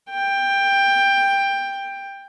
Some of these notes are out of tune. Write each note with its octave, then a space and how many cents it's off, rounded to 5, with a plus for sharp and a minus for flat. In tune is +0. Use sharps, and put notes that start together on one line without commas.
G5 +15